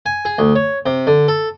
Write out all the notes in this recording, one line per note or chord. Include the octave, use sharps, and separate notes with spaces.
G#5
G#4
D2
C#5
C3
D3
A4